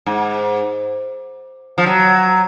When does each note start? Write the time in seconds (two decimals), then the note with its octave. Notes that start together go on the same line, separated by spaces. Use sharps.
0.06 G#2
1.78 F3
1.86 F#3